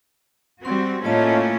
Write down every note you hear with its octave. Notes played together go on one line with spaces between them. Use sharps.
G3 C4 F#4 C6
A2 A3 A#3 C#4 F4 C#5 D#5 A5